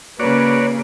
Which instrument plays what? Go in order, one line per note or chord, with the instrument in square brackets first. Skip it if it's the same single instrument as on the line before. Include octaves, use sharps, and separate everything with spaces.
[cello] C#3 A#3 [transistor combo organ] F#4 C#5 D5 [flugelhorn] B4